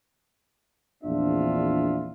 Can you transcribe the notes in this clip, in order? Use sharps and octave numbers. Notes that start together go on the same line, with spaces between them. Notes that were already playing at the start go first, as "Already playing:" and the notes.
A#1 E2 C4 D4 F4 E5